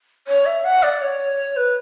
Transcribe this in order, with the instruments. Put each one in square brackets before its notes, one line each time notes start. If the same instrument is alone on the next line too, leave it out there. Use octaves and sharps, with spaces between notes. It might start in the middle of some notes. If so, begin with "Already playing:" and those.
[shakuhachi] C#5
E5
F#5
D5
C#5
B4